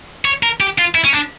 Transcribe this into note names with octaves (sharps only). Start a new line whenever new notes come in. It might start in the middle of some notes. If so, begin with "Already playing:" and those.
C#5
A#4
G4
F4
E4
C#4
D4